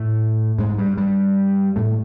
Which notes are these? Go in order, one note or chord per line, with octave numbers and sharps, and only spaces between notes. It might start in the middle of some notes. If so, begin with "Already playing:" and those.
Already playing: A2 A3
G#2 G#3
G2 G3
G2 G3
A2 A3